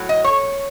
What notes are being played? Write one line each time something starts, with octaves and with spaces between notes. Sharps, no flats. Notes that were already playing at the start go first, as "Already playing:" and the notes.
Already playing: A2 F#3
D#5
C#5